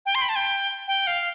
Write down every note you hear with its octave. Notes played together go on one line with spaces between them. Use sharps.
G5
C6
B5
A5
G5
G5
F5